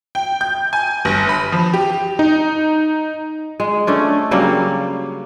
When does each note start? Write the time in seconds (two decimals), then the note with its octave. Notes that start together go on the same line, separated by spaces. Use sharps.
0.15 G5
0.41 G6
0.73 G#5
1.05 G1
1.29 B5
1.52 F3
1.74 G4
2.19 D#4
3.60 G#3
3.87 A3 C#4 D4
4.31 C#3 F#3 G3 A#3